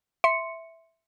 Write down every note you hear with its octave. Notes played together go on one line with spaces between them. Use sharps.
E5 C6 C#7